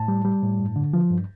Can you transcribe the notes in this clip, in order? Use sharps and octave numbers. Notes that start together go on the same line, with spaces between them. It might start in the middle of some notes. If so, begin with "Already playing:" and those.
Already playing: A2 A5
G3
G3
A2
G2
D3
F3
G2